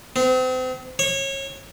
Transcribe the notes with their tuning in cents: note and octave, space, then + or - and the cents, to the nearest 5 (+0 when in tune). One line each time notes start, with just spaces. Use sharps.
C4 -35
C#5 -25